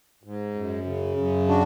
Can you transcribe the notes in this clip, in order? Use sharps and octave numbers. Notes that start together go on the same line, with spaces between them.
G#2
F#2
C#3
F#2
D4 F#4